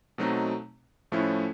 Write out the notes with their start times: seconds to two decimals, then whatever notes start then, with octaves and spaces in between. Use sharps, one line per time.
0.18 B2 F#3 A3 C4 D#4
1.12 A2 F3 A3 C#4 E4